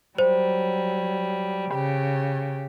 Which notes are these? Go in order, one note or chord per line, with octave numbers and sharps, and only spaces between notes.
F#3 G3 C5
C#3 G4